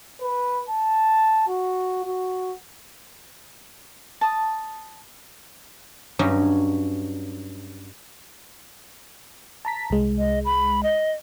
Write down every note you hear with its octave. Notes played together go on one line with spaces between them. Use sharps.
B4
A5
F#4
F#4
A5 D#6
G2 F#3 C#4 D#4
A5 A#5 B6
C2 G#3
D#5
B5
D#5